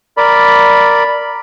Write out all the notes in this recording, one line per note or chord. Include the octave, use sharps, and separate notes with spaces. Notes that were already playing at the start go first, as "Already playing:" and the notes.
A#4 D5 B5